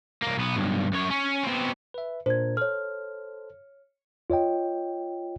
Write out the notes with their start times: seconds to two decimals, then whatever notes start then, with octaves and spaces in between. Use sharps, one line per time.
0.22 C2 A#3
0.37 B1 B3
0.56 B1 G2
0.93 F#2 C#5
1.10 C#4
1.44 B2 C4
1.94 B4 E5
2.26 A#2 D4 A#4 C5 G#6
2.57 A4 C5 C#5 F6
4.30 F4 C#5 D#5 G5